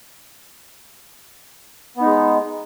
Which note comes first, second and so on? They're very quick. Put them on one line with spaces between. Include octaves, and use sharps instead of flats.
B3 D#4 G#3